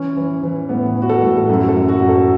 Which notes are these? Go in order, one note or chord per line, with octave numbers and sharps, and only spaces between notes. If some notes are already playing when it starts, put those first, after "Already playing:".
Already playing: E3 C#4
E3
E3
A2 B3
E3
F#4
A4
A2
A4
F#2 F#4
A4
F#2
F#4
F#2
A4